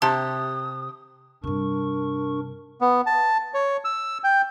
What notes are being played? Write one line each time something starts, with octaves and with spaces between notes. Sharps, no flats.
C3 G4 A5 D#6
G2 C3 D4 A#4 C#6
B3
A5
C#5
E6
G5